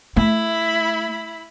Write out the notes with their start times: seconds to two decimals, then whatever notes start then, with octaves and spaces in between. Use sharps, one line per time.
0.16 A3 E4 B5